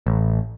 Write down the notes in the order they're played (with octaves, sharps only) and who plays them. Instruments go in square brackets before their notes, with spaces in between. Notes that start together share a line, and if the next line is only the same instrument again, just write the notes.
[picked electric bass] A1